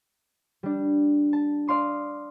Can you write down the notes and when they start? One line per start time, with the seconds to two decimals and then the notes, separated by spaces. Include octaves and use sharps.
0.63 G3 D4
1.33 A5
1.67 D5 F5 C6 D#6